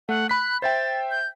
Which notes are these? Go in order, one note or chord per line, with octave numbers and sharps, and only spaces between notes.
A3 F#5
B5 F#6 B6
C5 E5 G5 A6
G6